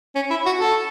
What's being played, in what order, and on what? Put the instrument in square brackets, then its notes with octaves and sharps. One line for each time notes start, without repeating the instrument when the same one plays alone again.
[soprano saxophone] C#4
E4
F#4
A4